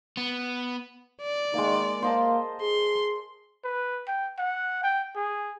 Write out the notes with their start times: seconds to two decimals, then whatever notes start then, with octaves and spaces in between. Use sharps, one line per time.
0.17 B3
1.21 D5
1.54 D#3 G#3 A#3
2.02 A#3 C5 D#5 A5
2.61 G#4 C6
3.64 B4
4.07 G5
4.38 F#5
4.83 G5
5.16 G#4